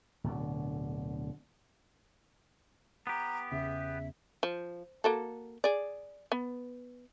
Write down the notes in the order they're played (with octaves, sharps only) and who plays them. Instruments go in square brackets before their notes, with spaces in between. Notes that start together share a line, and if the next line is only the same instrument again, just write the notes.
[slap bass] D1 B2 D3
[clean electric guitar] B3 G4 [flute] A#5
[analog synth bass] E2 [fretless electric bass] C#3 [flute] E5
[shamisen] F3
A#3 F#4 A4
G#4 D5
B3